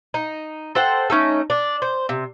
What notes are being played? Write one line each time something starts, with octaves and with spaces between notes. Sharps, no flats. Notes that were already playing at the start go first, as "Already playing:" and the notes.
D#4
A4 C5 F#5 G5
A3 C#4 D#4 A4
D4
C5
C3